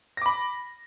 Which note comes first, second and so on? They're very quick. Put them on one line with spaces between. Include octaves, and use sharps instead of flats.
A#6 D6 B5